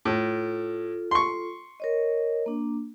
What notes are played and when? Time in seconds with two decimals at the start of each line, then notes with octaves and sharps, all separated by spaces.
0.05 A2 F4 A4
1.11 C6 C#6
1.80 A#4 C#5 D#5
2.46 A#3 D4